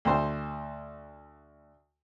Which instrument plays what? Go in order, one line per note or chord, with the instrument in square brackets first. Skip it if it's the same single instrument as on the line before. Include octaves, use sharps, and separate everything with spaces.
[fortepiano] D2 C5